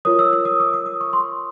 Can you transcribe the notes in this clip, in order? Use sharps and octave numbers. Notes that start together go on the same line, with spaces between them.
F4 A#4 C#5 D#6
E6
E6
D#6
D6
D#6
D#6
C#6
C6